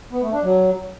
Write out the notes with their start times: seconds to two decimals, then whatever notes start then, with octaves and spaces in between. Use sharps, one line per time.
0.12 B3
0.22 A3
0.32 D4
0.43 F#3